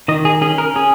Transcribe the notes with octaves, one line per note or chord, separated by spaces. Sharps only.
D#3 D#5
G#4
C#4 G#4
A#4
C#4 G#4